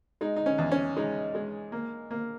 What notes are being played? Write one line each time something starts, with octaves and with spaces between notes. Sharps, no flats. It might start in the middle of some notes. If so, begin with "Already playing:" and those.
G#3 D#4
D#4
C#4
E2
C#4
G#3 D#4
G#3
A#3
A#3